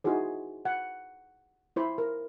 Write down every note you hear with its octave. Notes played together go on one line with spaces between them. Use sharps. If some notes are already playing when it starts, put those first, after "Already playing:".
D#4 E4 F#4 G#4 C5
F#5
E4 C5 B5
A#4